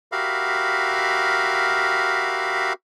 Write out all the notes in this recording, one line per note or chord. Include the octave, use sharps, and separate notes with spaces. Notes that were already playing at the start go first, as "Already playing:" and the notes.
F#4 G4 A#4 E5 F5 B5